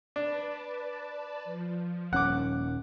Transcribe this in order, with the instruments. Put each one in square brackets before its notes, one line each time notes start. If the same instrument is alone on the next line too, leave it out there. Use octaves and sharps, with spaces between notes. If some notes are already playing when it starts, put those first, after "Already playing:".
[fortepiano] D4 [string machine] B4 D5 A5
[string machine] F3
[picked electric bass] D#1 C#4 [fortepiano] F#5 D6